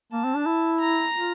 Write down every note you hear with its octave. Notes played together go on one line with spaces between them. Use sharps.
A#3 A5
C4
D4
E4
A#5
F4